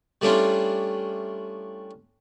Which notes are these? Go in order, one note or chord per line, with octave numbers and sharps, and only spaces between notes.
G3 A3 C#4 D4 E4 F4